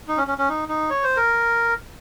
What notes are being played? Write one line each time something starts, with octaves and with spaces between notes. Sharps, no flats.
D#4
C#4
C#4
C#4
D#4
D#4
C#5
C5
A#4